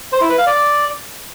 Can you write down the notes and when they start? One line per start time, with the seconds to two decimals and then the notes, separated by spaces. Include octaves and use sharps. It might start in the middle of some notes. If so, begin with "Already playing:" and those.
0.13 C5
0.21 E4
0.30 B4
0.38 F5
0.47 D5